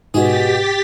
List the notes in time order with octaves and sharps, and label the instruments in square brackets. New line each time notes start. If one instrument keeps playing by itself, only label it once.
[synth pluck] G#2 [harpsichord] B2 G#4 [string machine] G4 A6 B6